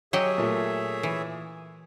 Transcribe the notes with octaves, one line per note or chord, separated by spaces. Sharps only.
F#3 G4 G#4 C#5 D#5 E5
A#2 A3
E3